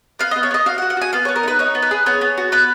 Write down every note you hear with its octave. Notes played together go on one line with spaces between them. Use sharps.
B3 F5
B3 D#5
C#5
B3 D#5
F#4 F5
F#5
F#4
F#5
F#4 G#5
B3 F5
B3 C#5
A#4
D#4 B4
D#4 C#5
B3
B4
G#4
B3 C#5
B3
F#4
B3 B4